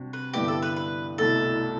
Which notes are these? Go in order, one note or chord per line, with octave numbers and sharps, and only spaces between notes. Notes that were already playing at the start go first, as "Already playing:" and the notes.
Already playing: C3 G3 D4 F#4
B4
G2 D3 G3 B3 E4 G4
A4
B4
B4
C2 B2 A3 E4 A4